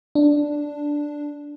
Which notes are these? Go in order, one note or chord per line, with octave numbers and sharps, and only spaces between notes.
D4